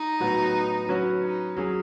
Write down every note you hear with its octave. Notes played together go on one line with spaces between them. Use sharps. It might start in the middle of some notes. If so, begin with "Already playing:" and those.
Already playing: D#4
A2 F#3 B3 F#4 B4
F#3 C#4 F#4 B4
D#4
F#3 C#4 G#4